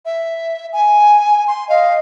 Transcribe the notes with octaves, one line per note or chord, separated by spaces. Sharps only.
E5
G#5
C6
D#5 F5